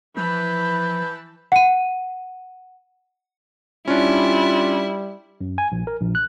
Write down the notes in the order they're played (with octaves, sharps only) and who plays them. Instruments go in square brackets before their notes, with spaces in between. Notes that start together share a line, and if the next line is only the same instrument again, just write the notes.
[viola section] E3 A5 B5 [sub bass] F3 [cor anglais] B4 [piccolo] G6
[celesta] F#5 D#7
[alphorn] G3 [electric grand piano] C#4 D4 [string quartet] E4 [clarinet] F4
[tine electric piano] F#2
G#5
A#1
A#4
A#1
F#6